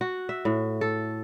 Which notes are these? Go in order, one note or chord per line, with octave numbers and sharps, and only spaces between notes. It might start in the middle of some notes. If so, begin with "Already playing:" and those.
F#4
E5
A2
A4